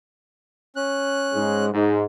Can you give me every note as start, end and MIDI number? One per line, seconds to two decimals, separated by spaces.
0.76 1.65 61
0.76 1.65 90
1.34 1.73 44
1.34 1.73 56
1.73 2.04 44